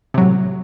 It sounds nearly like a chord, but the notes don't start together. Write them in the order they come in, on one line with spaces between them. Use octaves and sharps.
C3 F#3 A2